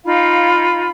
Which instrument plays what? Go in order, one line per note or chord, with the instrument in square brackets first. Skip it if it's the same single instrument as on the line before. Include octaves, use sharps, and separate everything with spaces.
[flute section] D#4 F4 F5 B5